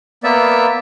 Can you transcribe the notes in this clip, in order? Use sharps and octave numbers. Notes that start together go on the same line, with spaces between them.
A#3 B3 D5 E5